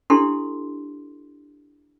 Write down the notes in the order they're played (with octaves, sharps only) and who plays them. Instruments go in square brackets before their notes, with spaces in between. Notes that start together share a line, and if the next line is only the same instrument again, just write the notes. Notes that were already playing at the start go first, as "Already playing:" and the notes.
[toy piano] D4 E4 G4 A4 C6